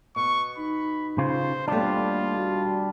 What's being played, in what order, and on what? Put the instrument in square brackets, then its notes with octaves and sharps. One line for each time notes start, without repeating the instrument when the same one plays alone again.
[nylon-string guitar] B2 [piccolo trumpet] C#6
[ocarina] D#4 [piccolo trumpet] B5
[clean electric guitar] C#3 F4 [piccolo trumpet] C5
[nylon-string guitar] D#2 B2 A3 [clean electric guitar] G3 D4 [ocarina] A#3 [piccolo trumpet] F4
[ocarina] F#4